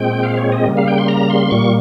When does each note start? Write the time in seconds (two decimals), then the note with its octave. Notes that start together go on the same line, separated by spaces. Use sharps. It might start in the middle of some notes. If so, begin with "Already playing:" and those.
Already playing: A#2 G#3 C4 G5
0.23 F5
0.37 C#5
0.52 D#5
0.65 C#3 G3 A#3
0.77 F5
0.87 G5
0.98 C6
1.08 A#5
1.30 C6
1.51 A#2 G3 A#3 C#6